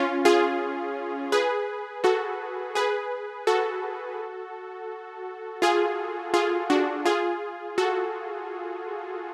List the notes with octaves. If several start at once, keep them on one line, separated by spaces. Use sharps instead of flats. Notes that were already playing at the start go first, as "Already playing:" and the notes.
Already playing: C#4 F4
F4 G#4
G#4 B4
F#4 A4
G#4 B4
F#4 A4
F4 G#4
F4 G#4
D4 F#4
F4 G#4
F#4 A4